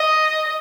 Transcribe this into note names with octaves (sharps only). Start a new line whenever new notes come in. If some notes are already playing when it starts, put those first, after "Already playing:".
Already playing: D#5